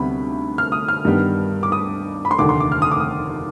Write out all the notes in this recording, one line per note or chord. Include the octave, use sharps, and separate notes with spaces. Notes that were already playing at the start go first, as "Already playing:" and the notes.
Already playing: D2 C3 G3 B3 B5
F6
D#6
F6
G2 D#3 G3 B3
D6
D#6
B5
C6
F1 D#2 D3 D6
C6
D6
F6
D#6
D6
D#6